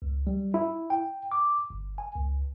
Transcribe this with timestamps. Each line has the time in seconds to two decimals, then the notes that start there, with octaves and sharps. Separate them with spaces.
0.02 C#2
0.27 G3
0.54 E4
0.90 G5
1.32 D6
1.70 G1
1.98 G#5
2.15 C#2